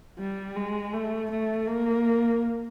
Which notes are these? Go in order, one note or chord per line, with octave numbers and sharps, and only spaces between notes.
G3
G#3
A3
A3
A#3